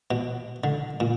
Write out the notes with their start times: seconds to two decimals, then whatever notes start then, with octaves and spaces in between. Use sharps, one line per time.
0.11 B2
0.64 D3
1.00 A#2